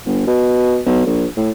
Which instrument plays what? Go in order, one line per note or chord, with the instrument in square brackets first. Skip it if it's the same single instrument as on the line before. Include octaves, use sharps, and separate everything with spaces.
[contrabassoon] G1
B2
B1
A#1
A2